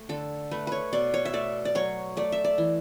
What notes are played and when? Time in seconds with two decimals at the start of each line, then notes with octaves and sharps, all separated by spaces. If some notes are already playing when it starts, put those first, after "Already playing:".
Already playing: A3
0.09 D3 A4
0.51 A3 B4
0.67 B4 C#5
0.93 B2 D5
1.14 C#5
1.25 E5
1.33 A3 D5
1.65 D5
1.75 F#3 C#5
2.17 A3 D5
2.32 E5
2.44 D5
2.58 E3